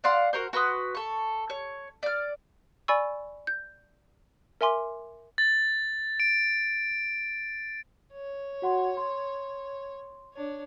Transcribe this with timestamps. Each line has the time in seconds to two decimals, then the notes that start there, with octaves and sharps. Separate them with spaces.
0.04 D5 F5 F#5 C6
0.33 F#4 A#4 C5
0.53 F#4 B4 C6 D#6
0.95 A4 C#6
1.50 C#5
2.03 D5 F6
2.88 D5 G#5 B5 C#6 E6
3.47 G6
4.61 A#4 E5 G#5 C6 D6
5.38 A6
6.20 D7
8.14 C#5
8.62 F#4 F#5 C6
8.97 C6
10.34 D4 C#5